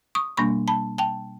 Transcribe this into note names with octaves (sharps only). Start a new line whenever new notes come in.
C#6 D#6
B2 G3 A#3 D4 B5 C#6
A5 B5
G5 A5